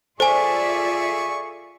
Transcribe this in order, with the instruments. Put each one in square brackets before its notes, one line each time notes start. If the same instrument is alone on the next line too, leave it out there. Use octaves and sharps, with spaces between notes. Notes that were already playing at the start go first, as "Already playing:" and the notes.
[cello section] F4 D5 E5 [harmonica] G#4 C#6 [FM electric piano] A4 [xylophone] C5 G#5